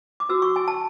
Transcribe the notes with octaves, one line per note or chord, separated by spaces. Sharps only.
D6
F#4 B4 E6
C#6
G#5
A5